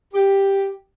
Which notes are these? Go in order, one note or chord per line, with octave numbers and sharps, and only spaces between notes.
G4